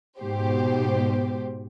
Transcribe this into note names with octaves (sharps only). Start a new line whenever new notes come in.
G#2 B2 G4 C5